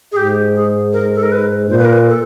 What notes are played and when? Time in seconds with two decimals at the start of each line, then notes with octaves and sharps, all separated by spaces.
0.12 G#4
0.16 G#2 G4
0.55 G#4
0.93 A#4
1.15 A4
1.23 A#4
1.32 B4
1.70 A#2 C5
1.78 B4
1.85 A#4
1.93 B4
2.08 A4